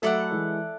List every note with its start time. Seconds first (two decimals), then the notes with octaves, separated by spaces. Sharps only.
0.02 F#3 A3 E4 A4 D5 F#5
0.31 E3 G#3